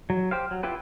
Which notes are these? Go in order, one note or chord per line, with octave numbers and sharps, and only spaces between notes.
F#3
G4 C5 F5
F#3
E4 F4 G4 B4